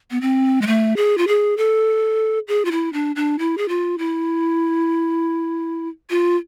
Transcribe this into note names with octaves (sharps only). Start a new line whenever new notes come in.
B3
C4
G#3
A3
G#4
F4
G#4
A4
G#4
F4
E4
D4
D4
E4
G#4
F4
E4
F4